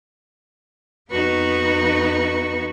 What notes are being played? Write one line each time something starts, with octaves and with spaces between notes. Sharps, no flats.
F2 B3 D#4 F#4 B4 C#6